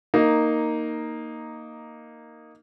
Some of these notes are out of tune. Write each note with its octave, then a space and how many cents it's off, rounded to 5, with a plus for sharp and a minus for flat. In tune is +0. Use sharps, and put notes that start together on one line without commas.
A#3 -5 D#4 +0